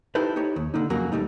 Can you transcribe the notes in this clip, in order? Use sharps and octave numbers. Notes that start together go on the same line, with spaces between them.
D#4 E4 G4 A4 B4 C5
D#4 G4 C#5
D#2
D3 A#3 D#4
F2 C#3 F#3 A#3 F#4 A#5
D#2 B2 G3 A3 D#4